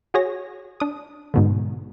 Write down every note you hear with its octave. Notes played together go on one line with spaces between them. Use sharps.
F#4 G#4 C#5 A#6
D4 D#6
G#2 B2 D3